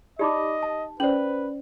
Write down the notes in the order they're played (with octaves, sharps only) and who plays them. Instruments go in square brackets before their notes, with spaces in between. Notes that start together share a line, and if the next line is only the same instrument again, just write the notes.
[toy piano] D#4 G4 [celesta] D5 B5 D6 [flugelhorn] D#5
[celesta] A5
[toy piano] C#4 C5 [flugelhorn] B4 [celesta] D5 F#7